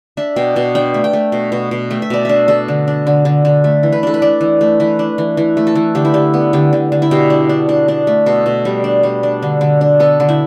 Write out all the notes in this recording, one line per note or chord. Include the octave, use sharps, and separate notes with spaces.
D4 E5
B2 G5
B2 A5
D4 G5
A3
G5
A3
B2
B2
B2
A3 G5
E5
B2 D5
D4 E5
D4 A4
D3
D4
D3
D3
D3
A3
E3
B4
D4 A4
B4
D4 D5
E3
A3
E3 B4
D4
E3
E3
A3
A4
E3
D3 G4
E4
D3 G4
B3
D3 G4
D3
D3
E4
B2 G4
D4
D4
D4
D4
A3
B2 A4
B2
G3
D4
G3
D4
D3
D3
D4
B3 A4
D3
E4